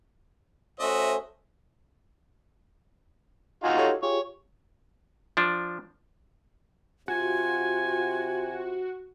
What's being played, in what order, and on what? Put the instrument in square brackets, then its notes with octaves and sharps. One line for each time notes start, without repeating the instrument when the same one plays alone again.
[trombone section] A3 C#4 C5 [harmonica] F#4 D#5 E5
[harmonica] D#4 F4 F#4 [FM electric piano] G#5
[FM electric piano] G4 A4 C#5
[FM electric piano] F4 G4 G#4 [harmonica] C#5
[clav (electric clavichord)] F3 D4
[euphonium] C3 [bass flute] F4 [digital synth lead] F#4 [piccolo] G#5